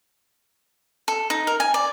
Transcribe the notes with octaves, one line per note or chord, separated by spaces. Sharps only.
A4
D#4
A#4
G#5
D5